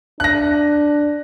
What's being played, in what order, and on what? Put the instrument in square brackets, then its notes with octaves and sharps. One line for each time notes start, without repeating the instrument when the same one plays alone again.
[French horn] D4 [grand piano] F#6 A#6